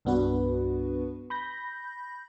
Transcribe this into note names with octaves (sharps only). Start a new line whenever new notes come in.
C2 G2 B3 D4 F#4 B4
B5 G6 A#6